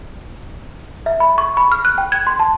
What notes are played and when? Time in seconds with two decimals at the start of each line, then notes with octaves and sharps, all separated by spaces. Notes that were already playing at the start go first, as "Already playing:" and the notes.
1.06 E5
1.20 B5
1.38 C#6
1.57 B5
1.72 F6
1.85 F#6
1.98 G5
2.12 G#6
2.27 C6
2.39 A5